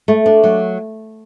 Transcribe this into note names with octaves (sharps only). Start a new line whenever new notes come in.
A3
D4
F#3